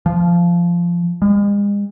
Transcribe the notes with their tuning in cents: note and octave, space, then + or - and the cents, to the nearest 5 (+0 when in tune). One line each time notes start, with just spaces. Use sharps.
F3 -15
G#3 -40